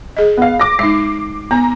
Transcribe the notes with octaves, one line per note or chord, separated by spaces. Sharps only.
G#4 D#5
B3 F5
D6 A#6
G#3 D#4 C7
B3 A#5